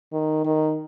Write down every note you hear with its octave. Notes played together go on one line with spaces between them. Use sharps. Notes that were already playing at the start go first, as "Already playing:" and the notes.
D#3
D#3